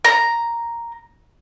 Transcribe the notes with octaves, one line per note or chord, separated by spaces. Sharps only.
A#5